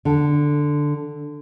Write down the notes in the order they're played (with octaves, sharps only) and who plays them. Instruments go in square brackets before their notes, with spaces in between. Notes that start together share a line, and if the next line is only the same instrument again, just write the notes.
[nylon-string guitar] D3